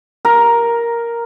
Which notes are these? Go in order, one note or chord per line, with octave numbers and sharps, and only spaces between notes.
A#4